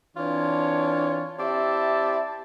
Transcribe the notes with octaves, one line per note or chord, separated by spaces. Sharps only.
E3 C4 D4 F4 C#5
C4 E4 G4 D5 E5 A5